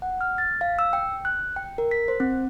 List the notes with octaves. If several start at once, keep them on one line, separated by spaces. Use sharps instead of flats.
F#5
F6
A6
F5
E6
G5
F#6
G5
A#4
B6
C5
C4